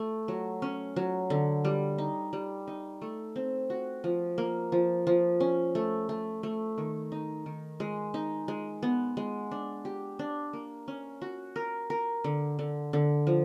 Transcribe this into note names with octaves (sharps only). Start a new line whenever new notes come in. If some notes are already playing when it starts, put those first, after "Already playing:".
Already playing: A3
F#3
C#4
F#3
D3
G3
D#4
G3
D#4
A3
C4
F#4
F3
A#3
F3
F3
C#4
A3
A3
A3
D#3
D#4
D#3
G#3
D#4
G#3
B3
G#3
D4
G4
D4
A#3
C#4
F#4
A#4
A#4
D3
D3
D3
F3